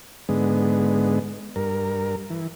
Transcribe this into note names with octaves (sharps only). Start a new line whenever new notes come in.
G#2 D3 G#3 B3
G2 A#4
E3